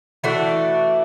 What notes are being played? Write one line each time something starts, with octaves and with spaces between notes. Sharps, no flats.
E3 A3 D4 F#4